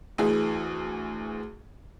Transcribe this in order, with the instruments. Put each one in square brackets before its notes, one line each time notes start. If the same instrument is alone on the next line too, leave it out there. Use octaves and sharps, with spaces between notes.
[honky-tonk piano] D2 E3 G#4